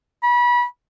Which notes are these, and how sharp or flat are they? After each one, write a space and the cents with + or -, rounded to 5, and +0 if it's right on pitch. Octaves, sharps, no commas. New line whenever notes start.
B5 -30